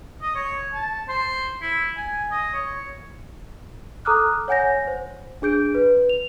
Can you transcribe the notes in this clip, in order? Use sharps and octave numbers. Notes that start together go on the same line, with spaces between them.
D#5
C#5
A5
C5
E4
G#5
D#5
C#5
A4 A#5 D6 D#6 F6 F#6
C#5 F#5 G#5 G6 A#6
C5
D4 G#4 G6 D7
B4
F7